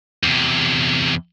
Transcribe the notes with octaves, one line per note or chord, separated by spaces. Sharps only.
E2 C3